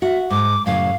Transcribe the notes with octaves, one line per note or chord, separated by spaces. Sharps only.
F#4 E5
G#2 D6
F#2 A2 C#3 F5